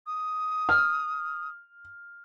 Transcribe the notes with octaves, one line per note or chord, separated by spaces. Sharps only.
D#6
F6